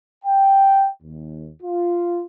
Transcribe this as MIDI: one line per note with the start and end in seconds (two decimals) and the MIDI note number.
0.25 0.88 79
1.03 1.50 39
1.63 2.23 65